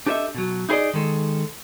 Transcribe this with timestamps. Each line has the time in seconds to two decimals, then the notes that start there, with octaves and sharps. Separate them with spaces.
0.07 D4 G4 A4 B4 D#5 E5
0.35 B2 F#3
0.69 D#4 E4 G#4 B4 D5 D#5
0.94 D#3 G#3 A4